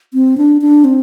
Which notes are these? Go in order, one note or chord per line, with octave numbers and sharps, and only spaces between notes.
C4
D4
D4
C4